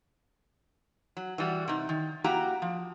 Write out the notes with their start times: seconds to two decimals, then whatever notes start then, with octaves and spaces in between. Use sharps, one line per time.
1.17 F#3
1.38 E3 G3 F#4
1.68 C3 D#4
1.89 D#3
2.24 A#3 E4 F#4 G4 G5 A#5
2.62 F3